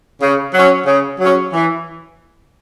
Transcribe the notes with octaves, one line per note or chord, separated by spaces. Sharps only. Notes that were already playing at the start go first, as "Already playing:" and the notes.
C#3
F#3 C#4
C#3
F#3 C#4
E3